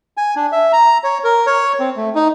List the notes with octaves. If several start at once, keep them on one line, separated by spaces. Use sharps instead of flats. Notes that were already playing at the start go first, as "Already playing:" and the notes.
G#5
D4
E5
A#5
C#5
A#4
C#5
C4
A3
D#4